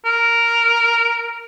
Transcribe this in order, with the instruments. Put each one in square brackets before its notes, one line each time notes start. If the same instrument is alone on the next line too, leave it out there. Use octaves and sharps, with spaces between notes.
[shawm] A#4